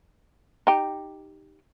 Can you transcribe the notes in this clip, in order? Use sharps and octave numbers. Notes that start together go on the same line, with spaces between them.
D#4 G4